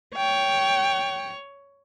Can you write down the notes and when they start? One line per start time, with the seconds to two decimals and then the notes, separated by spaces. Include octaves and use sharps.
0.16 C#5 G5